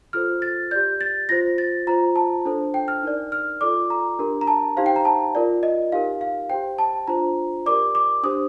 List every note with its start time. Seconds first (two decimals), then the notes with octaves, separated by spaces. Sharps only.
0.13 F4 A4 C5 F6
0.42 A6
0.71 G4 D5 G6
1.01 A6
1.29 F4 C5 A#6
1.58 A6
1.87 F4 C5 A#5
2.16 A5
2.45 D4 A4 C5
2.74 G5
2.88 F6
3.03 D#4 A#4 D5
3.32 F6
3.61 F4 A4 D5 D6
3.90 A#5
4.19 D4 G4 A#4
4.41 A#5
4.47 A5
4.77 D#4 G4 C5 F5
4.86 G5
4.96 A#5
5.05 A5
5.35 F4 A#4 D5
5.63 D#5
5.92 D#4 G4 A#4 F5
6.21 F5
6.50 G4 C5 G5
6.78 A5
7.08 D4 F4 C5 A#5
7.66 G4 A#4 D5 D6
7.95 D6
8.23 D4 G4 C5 D#6